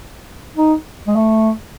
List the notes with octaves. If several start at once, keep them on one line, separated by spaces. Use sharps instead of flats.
D#4
G#3
A3